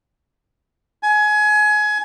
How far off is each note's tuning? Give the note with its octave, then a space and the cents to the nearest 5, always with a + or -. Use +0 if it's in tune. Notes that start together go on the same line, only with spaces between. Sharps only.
G#5 +25